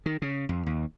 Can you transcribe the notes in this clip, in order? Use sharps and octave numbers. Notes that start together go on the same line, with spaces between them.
D#3
C#3
F2
D#2